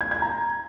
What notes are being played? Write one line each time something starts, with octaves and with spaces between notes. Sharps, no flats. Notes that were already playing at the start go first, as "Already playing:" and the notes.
G#6
G#6
A#5